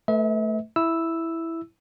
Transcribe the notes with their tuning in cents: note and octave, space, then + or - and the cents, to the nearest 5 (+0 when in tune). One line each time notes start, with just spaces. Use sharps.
A3 +0 B4 +0 E5 -40
E4 +0 E6 +0